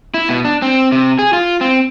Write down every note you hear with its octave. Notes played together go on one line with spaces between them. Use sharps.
E4
B2
D4
C4
C3
G#4
F4
C4